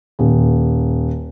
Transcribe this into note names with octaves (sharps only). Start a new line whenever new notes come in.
D#1